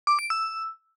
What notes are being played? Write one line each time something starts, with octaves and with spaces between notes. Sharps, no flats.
D6
D7
E6